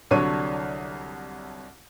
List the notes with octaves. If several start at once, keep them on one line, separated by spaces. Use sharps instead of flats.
C2 D3 F#3 D4 C#5 D#7